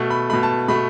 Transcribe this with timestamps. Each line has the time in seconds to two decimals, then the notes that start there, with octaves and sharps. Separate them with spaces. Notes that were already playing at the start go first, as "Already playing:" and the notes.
Already playing: B2 A3
0.10 B5
0.30 B2 A3 B5
0.43 A5
0.68 B2 A3 B5